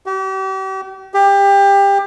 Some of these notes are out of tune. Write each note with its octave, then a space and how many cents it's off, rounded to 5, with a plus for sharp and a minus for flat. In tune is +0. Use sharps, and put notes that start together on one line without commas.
G4 -40
G4 +25